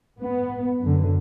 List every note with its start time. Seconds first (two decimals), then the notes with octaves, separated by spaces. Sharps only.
0.21 B3
0.81 F#2 D3